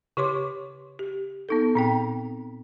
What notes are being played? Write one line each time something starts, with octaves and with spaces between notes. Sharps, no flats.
C#3 G4 C#5 C6 D6
G4
B3 D#4 A4
A#2 C4 G5